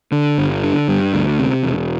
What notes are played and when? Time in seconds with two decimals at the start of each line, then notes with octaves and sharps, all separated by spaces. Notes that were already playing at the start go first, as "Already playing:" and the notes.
0.12 D3
0.38 G1
0.64 D3
0.88 G2
1.14 D2
1.39 C3
1.64 E1